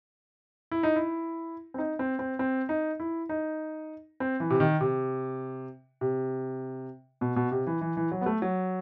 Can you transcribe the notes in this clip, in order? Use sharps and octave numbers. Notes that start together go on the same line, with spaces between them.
E4
D#4
E4
C4
D#4
C4
C4
C4
D#4
E4
D#4
C4
E3
C3
D#3
C3
C3
B2
B2
C3
E3
E3
E3
F#3
B3
A3
F#3